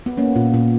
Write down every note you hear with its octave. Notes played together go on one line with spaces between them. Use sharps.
B3
A#3 C#4
A#2
A#2